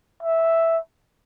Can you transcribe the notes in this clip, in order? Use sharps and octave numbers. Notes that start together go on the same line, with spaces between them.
E5